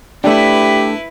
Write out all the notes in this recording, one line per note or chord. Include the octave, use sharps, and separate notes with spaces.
A3 D4 E4 G4 B4